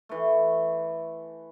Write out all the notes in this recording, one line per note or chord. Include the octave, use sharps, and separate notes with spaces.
E3 A3